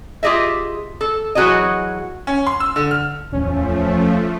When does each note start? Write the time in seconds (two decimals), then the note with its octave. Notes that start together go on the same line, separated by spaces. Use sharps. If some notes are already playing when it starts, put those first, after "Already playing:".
0.23 F4 G4 G#4 D#5 E5
1.01 A4
1.35 E3 F#3 F#4 G#4 C#5 D#5
2.27 C#4
2.47 C6
2.60 E6
2.76 D3
2.91 F6
3.32 D1 E2 F3 A3 C#4